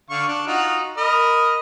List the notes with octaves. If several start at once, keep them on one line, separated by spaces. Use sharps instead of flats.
D3 F5 C#6
D4
D#4 F4 F#4
A#4 D#5 B5